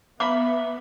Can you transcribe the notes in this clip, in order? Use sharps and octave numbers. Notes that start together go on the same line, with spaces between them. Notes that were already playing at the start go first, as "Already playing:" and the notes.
B3 E5 F5 A#5 B5 D6